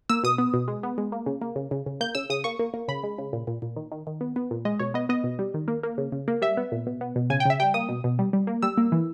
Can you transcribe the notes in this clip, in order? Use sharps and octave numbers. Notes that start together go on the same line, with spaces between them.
A#3 E6
B2 D#6
B3
B2
G#3
B3
G#3
A#3
C#3
A#3
C#3
C#3
C#3
A#3 G6
C#3 E6
C#3 D#6
A#3 C#6
A#3
A#3
C#3 B5
G#3
C#3
A#2
A#2
A#2
D#3
D#3
D#3
B3
B3
A#2
G#3 D#5
B2 C#5
B3 D#5
B3 D#5
B2
G3
D#3
A#3
A#3
C#3
C#3
A#3
G3 E5
B3
A#2
B2
B3
B2
C#3 G#5
G5
C#3 E5
G3 G5
A#3 D#6
B2
B2
G3
G3
A#3
G3 E6
A#3
E3